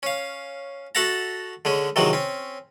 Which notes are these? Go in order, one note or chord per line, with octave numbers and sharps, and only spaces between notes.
C#4 F5
F#4 A4 E5 F#5 A5 A#5
D3 G#3 C#4
C3 D#3 E3 F#3 G#3 F#4
C4 C#4